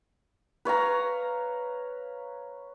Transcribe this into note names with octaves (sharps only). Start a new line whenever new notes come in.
B4 C#5 F5 A#5